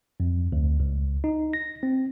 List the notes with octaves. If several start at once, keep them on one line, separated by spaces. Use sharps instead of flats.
F2
D2
C#2
D#4
A#6
C4